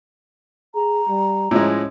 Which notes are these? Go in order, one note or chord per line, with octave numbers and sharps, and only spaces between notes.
G#4 A#5
G3
A2 F3 G#3 C#4